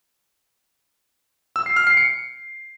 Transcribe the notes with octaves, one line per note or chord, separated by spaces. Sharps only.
E6
C7
F6
C7
C#7